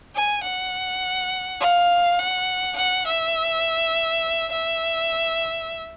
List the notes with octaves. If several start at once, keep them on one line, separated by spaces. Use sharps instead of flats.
G#5
F#5
F5
F#5
F#5
E5
E5